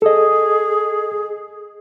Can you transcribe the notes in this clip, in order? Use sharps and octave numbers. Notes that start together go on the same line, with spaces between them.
G#4 A4 D#5